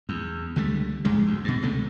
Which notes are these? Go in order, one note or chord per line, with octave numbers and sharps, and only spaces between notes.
E2
C#2 D3 G3 A3
F2 G#2 C#3 G#3
D2
G2 B2
C#2 C3 A3